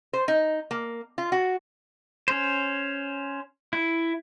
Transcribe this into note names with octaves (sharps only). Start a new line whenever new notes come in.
C5
D#4
A#3
F4
F#4
C#4 C5
E4